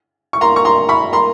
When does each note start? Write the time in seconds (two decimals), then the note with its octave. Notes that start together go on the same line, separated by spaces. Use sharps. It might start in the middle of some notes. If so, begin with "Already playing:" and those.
0.33 C#6
0.41 A#3 A#5 C6
0.56 C#6
0.65 A#5 C6
0.89 B5 C#6
1.13 A#3 A#5 C6